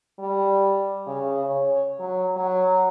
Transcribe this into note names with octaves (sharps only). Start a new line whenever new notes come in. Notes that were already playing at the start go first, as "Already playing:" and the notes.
G3
C#3
C#5
F#3
F#3